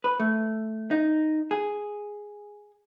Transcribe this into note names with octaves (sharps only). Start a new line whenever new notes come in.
B4
A3
D#4
G#4